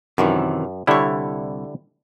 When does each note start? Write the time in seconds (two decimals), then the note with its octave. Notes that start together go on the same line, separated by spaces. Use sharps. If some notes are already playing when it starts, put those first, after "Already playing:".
0.18 F#2 C3 D#3 E3
0.87 C2 D3 G3 E4 C#5